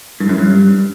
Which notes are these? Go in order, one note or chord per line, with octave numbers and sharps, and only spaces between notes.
G2
F#2
G2